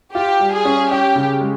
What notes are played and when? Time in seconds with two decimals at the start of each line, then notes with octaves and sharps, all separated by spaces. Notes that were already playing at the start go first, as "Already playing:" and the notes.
0.15 F4 G4
0.40 G3
0.53 G#4
0.65 C#4
0.91 C#4 G4
1.16 C#3
1.41 G#3